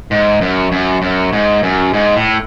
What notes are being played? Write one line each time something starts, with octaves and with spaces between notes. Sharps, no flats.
G#2
F#2
F#2
F#2
G#2
F#2
G#2
A2